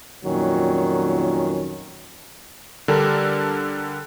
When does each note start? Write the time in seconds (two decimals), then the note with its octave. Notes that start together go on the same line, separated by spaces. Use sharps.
0.24 F2 A#2 D#3 F#3 C#4
2.88 D3 G3 D4 A4 A#4